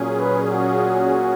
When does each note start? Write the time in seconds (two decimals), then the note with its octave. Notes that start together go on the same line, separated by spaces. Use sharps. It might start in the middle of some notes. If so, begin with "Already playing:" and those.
Already playing: A#2 F#3 C#4 G#4
0.20 B4
0.50 F#4